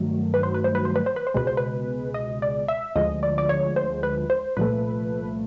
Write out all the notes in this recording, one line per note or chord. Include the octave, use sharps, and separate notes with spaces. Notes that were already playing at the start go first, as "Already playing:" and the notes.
Already playing: G2 D#3 F#3 A3
B4
C5
B4
C5
B4
C5
B4
C5
B4
C5
C#2 B2 G#3 B4
C5
B4
D#5
D5
E5
D2 D3 F3 G#3 D#5
D5
D5
C#5
C5
B4
C5
C2 A#2 F3 A3 B4